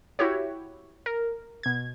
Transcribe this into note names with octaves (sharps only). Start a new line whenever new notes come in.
E4 F#4 G4 C#5
A#4
B2 G#6